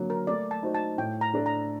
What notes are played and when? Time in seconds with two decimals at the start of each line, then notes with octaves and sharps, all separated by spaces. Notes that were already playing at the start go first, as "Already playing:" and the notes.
Already playing: D3 F#3 A#3
0.10 A#4
0.27 A3 D5
0.51 A5
0.63 D#4 F#4 C5
0.75 A5
0.98 A2 G5
1.21 A#5
1.34 A3 D4 A4
1.46 A#5